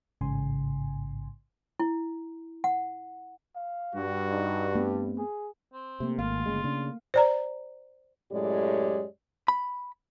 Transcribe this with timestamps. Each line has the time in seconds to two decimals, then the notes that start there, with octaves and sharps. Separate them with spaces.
0.21 A1 G#2 C#3 G#5 C6
1.79 E4
2.64 F#5
3.56 F5
3.95 G2 F#4
4.31 D#4
4.75 A3 B3 C4 D4
5.18 G#4
5.73 C4
6.00 C3 A3 A#3
6.19 G#1 F4 F5
6.46 G1 C#3 G#3
6.64 C#3 D4
7.14 C5 D5 A#5
8.32 F#2 A2 G#3 G4 C#5 D5
9.48 B5